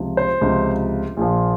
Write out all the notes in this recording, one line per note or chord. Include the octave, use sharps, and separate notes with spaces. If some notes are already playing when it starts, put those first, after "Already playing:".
Already playing: C#2 C3 F3
C5
C#2 C3 F3
A#1 A#2 F3